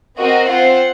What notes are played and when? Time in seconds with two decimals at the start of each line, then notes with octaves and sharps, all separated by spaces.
0.19 C4 F#4 A#4 D#5
0.48 C4 F4 C5 F#5